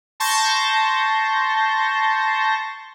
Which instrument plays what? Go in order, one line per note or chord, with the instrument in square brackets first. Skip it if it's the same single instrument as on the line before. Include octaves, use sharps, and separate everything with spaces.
[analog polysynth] A5 C6 C#6 G6 A#6